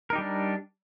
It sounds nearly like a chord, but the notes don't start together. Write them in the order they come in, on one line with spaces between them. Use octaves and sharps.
A#4 D#4 G4 G3 D4